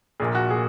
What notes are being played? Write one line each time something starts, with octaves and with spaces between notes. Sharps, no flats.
A#1 A#2 G#4
F#4
A#2 G#4